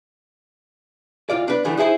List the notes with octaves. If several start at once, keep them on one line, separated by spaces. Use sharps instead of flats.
D2 F4 D5
D4 B4
D3 E3 G3 A3
D#4 E4 G#4 A4 C5